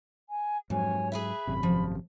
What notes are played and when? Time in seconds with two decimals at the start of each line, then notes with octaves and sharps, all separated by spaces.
0.28 G#5
0.70 F2 G#2 F#3 C#5 G#5
1.12 G#4 B4 E5 B5
1.47 G#1 F#2 C3
1.63 F3